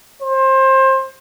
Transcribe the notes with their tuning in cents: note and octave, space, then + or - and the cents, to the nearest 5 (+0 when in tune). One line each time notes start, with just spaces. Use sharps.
C5 +25